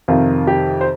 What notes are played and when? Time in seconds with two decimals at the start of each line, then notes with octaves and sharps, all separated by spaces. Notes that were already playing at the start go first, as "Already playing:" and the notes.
0.08 F2 C3 D#3 F4
0.47 G4
0.81 C5